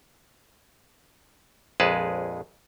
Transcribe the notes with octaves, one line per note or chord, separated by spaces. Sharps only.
A#1 F2 G#3 G#4 B4 A5